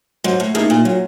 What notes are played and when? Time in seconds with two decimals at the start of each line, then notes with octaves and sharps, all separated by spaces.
0.24 G#2 F#3
0.40 A2
0.54 A2 A#3 D#4 G#4
0.70 A#2
0.85 A#2 F#3